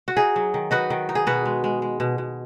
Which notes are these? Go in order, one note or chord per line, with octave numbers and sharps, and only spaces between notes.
F#4
D#4 G#4
F#3
D#3
D#4 F#4 B4
D#3
D#4
G#4
B2 F#4 B4
G#3
G#3
G#3
B2
B2